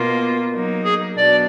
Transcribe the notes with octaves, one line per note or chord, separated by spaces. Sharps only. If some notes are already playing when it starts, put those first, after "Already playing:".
Already playing: B2 A#3 F4
F#3 A#3 D#4
G#4
B2 F#3 D4 D5